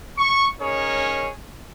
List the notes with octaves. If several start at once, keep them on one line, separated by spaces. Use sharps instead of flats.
C#6
C#4 D#4 G#4 A#4 C#5